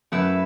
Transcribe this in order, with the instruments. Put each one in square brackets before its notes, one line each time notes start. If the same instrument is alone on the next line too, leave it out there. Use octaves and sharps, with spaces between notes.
[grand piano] F#2 [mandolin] A3 E4 B4 E5